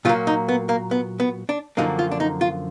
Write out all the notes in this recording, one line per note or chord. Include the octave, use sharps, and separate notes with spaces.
A#2 F#3 A#3 F4
D#4
B3
A#3
B3
B3
D4
F#2 D3 F3 A#3 D#4
F4
D4
D#4
F4